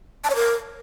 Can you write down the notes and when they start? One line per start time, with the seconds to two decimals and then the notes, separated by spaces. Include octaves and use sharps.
0.24 A5
0.30 C#5
0.36 A#4